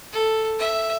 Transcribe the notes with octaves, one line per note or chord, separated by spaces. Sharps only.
A4
E5